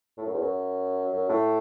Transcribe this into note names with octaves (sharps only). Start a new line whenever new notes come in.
A2
F#2
E2
F#2
F#2
A2